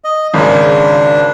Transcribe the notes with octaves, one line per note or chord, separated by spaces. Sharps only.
D#5
G#1 C#3 D4